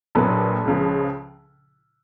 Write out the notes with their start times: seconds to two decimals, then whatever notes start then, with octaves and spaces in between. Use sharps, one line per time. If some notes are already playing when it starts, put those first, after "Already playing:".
0.15 A#1 A#2 F#3 A4 B4
0.65 C#2 C#3 F3